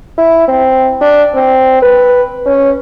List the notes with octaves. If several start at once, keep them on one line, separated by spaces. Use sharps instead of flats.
E4
C4
D4
C4
B4
C#4